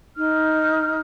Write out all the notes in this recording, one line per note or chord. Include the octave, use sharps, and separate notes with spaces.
D#4 F6